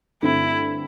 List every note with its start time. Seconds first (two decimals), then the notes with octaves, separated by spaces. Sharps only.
0.22 G2 D3 A3 C4 E4